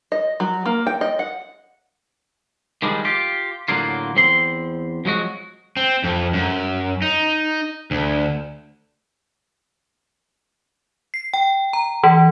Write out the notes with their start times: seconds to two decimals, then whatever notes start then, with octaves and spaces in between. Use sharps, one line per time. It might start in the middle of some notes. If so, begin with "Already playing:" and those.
0.12 D#5
0.40 F#3
0.66 A#3
0.87 G5
1.01 D#5
1.19 F#5
2.82 D#3 F3 G3 G#3 D4
3.05 F4 G4
3.68 A2 D3 F#3 A#3 F4
4.16 E2 C4 C6
5.05 F3 F#3 G#3 F#4
5.77 C4
6.04 F2
6.33 F#2
7.02 D#4
7.91 D2
11.14 C7
11.34 G5
11.73 A#5
12.03 E3